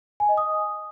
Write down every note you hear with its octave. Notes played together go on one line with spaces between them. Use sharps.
G#5
D#5
D#6